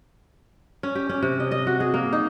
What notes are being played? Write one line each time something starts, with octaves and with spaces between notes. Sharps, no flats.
C#4
G4
C#4
C3
D#5
D#5
F#4
G#4
A#3
D#4